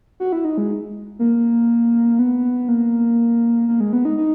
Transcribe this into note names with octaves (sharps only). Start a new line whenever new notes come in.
F#4
E4
D#4
G#3
A#3
B3
A#3
A#3
G#3
B3
D#4
D#4